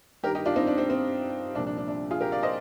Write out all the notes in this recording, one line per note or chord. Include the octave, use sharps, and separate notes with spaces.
G2 D#3 G4 A#4
D#4 G4
D4 F4
C4 D#4
D4
C4
C4
C2 A#2 F3 D4
D4
D4
D4
F4 G#4
G4 A#4
D5 F5
C5 D#5